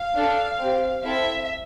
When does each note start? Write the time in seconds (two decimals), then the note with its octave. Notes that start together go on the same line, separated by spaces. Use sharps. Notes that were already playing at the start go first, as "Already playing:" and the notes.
Already playing: F5
0.16 D4 A4
0.59 C4 G4
1.03 C4 E4 A4 E5